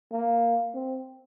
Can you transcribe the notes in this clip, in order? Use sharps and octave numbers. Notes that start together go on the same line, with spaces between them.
A#3
C4